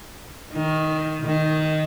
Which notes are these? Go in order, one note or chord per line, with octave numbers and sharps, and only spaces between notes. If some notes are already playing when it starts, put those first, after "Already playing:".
D#3
D#3